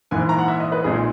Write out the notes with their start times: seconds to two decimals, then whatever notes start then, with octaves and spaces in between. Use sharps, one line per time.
0.11 A#1 G#2 E3 A#3 G#5
0.29 A#5
0.38 F#5
0.48 E5
0.60 D#5
0.72 B4
0.84 B1 A#2 G#3 D#4 G#4